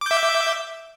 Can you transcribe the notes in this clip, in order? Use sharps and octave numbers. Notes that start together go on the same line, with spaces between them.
E5 D6 G6